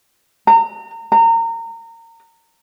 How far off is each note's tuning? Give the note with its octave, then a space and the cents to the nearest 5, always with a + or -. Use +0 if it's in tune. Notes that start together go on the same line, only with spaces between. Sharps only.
A#5 -35
A#5 -30